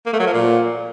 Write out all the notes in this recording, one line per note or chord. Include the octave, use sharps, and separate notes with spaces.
A#3
A3
F#3
F3
A#2